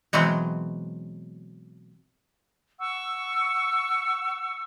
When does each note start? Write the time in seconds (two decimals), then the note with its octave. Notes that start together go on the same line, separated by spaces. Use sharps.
0.13 B2 E3 F#3 G#3 C4
2.79 F#5 C#6 E6